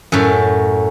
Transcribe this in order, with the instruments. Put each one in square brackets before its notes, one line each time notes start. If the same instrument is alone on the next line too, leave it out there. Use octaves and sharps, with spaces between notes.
[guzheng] F#2 A2